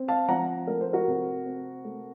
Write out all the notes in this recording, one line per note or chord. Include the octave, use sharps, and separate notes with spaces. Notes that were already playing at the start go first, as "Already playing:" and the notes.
Already playing: C4
F5 A5
F3 F#5 A#5
A3 A#4
C5
F#4 A#4
C3
C4
A3